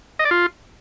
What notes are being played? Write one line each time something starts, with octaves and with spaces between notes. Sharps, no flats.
D#5
D5
F4